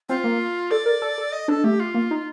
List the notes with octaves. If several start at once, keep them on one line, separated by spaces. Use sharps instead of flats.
C4 F4
A#3
A4 D5
A#4
A4
A4
D#5
D4 A4
A3 G4
F4
A#3
D#4